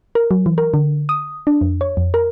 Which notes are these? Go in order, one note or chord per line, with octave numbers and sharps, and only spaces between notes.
A#4
F#3
E3
A#4
D3
D#6
D4
F2
C#5
F2
A#4